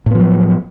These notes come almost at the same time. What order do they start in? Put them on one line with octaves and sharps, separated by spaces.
A2 B3 F3 F#3